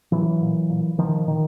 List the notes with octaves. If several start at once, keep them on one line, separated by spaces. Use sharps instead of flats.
A2 E3 F#3
A#2
A#2
B2 D#3 F3
A#2 D#3